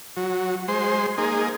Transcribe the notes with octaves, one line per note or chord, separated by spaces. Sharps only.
F#3
G#3 C5
A#3 D#4 G#4